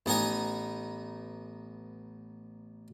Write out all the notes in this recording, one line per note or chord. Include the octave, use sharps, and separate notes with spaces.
A1 B3 D#4 G#5 A#5